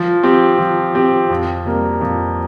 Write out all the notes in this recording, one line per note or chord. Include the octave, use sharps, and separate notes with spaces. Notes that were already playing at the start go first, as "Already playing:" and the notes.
Already playing: F3
C4 G4
F3
C4 G4
F2
C3 G3 A#3
F2